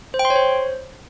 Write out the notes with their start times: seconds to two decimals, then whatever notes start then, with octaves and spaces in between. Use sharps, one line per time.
0.14 C5
0.19 G5
0.25 C6
0.30 C#5
0.36 C5